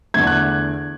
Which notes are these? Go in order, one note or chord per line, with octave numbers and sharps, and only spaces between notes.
E2 D3 A3 G#6
F#6